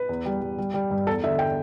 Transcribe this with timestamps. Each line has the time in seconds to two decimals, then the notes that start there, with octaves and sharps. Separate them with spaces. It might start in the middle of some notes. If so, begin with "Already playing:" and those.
Already playing: B4
0.09 E2
0.26 G3
0.41 G3
0.58 G3
0.74 G3
0.91 G2
1.07 E2 A4
1.24 D3 E5
1.39 G5